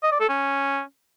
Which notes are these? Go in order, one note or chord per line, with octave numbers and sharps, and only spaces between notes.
D#5
D5
A4
C#4